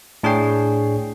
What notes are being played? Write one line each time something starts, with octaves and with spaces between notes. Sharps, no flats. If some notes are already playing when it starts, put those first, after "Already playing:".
A2 D4 G#4 C#5 G5 C7